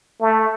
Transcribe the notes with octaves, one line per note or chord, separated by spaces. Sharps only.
A3